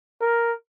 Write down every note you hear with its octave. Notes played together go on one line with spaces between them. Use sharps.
A#4